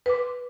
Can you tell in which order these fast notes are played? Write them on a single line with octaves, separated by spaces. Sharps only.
B4 D6 C6